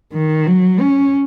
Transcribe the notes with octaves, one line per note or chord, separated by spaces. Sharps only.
D#3
F#3
C#4